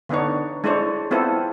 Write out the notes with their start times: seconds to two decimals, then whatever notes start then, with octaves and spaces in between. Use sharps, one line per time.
0.09 D3 B3 D4 D#4 C#5
0.64 G#3 D4 E4 A4 C5 C#5
1.11 B3 C4 E4 F4 A4